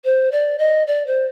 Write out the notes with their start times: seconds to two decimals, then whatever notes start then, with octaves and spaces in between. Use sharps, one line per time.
0.04 C5
0.31 D5
0.58 D#5
0.87 D5
1.06 C5